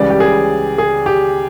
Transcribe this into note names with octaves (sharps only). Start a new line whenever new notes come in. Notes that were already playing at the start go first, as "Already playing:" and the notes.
Already playing: C#2 C#3 E3 G3 D5
G4
G#4
G#4
G4